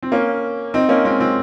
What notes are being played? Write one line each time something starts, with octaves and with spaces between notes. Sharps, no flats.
C4
A#3 C#4
C4 D#4
A#3 C#4
G#3 C4
G#3 C4